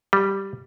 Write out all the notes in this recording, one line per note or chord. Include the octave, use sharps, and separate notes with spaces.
G3